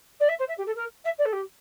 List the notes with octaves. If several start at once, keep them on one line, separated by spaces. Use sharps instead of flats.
D5
E5
C5
E5
G4
A4
A#4
E5
D5
A4
G4